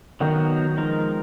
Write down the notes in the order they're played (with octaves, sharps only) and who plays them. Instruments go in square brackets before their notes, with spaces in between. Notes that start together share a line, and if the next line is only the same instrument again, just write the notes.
[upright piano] D#3 [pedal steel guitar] F#3 B3 D#4 F#4
[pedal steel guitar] F3 G#3 D#4 A#4